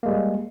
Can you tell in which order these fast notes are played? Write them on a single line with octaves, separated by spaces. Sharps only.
A#3 G#3 G3